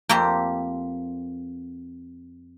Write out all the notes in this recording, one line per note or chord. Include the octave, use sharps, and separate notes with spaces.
F2 A#3 C4 G4